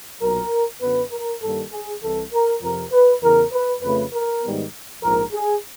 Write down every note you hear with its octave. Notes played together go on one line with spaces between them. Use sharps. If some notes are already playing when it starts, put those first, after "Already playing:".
B1 A#2 F#3 A#4
F#2 D3 F#3 B3 B4
A#4
G2 D#3 G3 A#3 A4
G#4
C2 C3 E3 A4
A#4
F2 C3 F3 A#4
B4
E2 C#3 E3 A#4
B4
F2 C#3 F3 A3 B4
A#4
G#2 D#3 G3 B3
A#1 G#2 F3 A#4
G#4